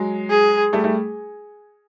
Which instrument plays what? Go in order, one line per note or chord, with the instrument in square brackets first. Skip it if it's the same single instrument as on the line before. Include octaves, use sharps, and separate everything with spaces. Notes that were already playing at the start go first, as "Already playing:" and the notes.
Already playing: [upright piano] F#3 G#3
[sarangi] G#4
[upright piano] G3 A3
G3 A3